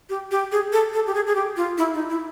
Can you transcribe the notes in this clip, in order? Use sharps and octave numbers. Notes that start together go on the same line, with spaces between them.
G4
G4
G#4
A4
A4
G4
G#4
G#4
G4
F4
E4
D#4
E4